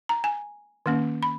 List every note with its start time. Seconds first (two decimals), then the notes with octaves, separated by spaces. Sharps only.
0.09 A#5
0.24 G#5
0.86 D#3 A#3 C#4
1.23 B5